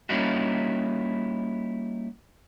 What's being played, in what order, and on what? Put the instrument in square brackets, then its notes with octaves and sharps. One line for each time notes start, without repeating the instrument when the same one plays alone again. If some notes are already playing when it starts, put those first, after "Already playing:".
[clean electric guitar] G3 A#3 C#4 D#4 E4 F#4